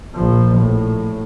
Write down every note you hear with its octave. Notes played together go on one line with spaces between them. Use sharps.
A#1 F3
A2